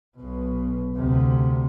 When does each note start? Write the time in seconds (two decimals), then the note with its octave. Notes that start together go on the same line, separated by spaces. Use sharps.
0.17 B1 B2
0.96 D2 C3